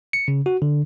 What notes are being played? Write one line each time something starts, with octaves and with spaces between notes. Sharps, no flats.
C#7
C#3
F#4
D3